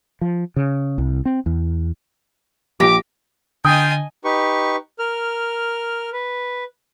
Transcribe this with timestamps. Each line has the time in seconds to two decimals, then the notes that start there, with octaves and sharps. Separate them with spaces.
0.21 F3
0.56 C#3
0.98 C2
1.25 C4
1.46 E2
2.80 A#1 G4 D6 A#6
3.65 D3 F4 D#5 G5 G#5 D#6
4.24 D#4 G4 B4 C#6
4.99 A#4 F6
6.13 B4